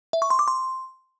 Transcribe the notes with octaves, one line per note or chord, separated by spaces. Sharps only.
E5
C#6
C6
D6
C6